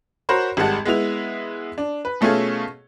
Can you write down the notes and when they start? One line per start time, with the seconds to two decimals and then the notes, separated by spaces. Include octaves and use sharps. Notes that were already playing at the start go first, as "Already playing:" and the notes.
0.29 F#4 A#4 C5 C#5 B5
0.57 G#1 G3 G#3 F#5 A5
0.85 G#3 B3 E4 F7
1.78 D4
2.05 B4
2.21 B2 A3 C#4 F4 G#4 A4